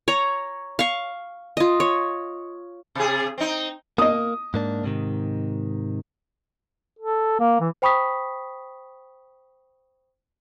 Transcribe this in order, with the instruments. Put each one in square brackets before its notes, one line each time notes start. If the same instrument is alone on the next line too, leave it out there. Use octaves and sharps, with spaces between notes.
[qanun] C#5 A#5
F5 C#6
F4 D#5
C#5
[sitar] C3 G#4
C4 D#4
[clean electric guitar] A#3 [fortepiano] D#5 D#6
[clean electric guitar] G#2 A#3 D4
G#2 C3 D#3
[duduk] A4
A#3
E3
[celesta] C5 G5 B5 C#6 D#6 B6